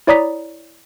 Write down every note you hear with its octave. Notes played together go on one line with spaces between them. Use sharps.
E4 C#5 D5 A#5 D#6 B6